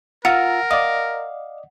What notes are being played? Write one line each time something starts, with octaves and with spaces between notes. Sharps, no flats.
F4 A#4 F#5 A#5 E6 F6
D5 D#5 F5